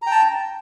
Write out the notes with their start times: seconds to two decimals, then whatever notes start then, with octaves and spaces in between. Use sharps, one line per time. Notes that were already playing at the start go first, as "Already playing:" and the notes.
0.02 A#5
0.07 G5
0.11 A5